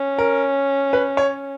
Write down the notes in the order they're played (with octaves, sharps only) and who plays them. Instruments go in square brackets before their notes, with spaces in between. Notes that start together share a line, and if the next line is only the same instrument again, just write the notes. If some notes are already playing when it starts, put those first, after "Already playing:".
Already playing: [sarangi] C#4
[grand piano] A#4
B4
C#5